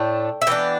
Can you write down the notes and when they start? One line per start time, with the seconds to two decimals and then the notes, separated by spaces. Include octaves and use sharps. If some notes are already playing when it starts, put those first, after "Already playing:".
Already playing: A2 A3 D4 G5
0.41 E5
0.47 E3 B3 D4 G5